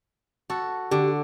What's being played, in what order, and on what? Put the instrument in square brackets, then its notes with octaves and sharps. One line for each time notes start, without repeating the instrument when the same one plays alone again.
[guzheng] F#4 A4
[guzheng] D3 [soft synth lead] G4